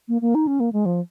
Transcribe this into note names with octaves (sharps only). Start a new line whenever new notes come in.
A#3
A#3
D#4
C#4
A#3
G#3
F3